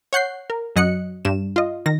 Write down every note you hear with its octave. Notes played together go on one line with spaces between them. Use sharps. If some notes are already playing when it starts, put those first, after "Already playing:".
C#5 F#5 G6 C7
A#4
F#2 F#3 D#5 F#6 C#7
G2 E7
F4 D#5
D#3 A#6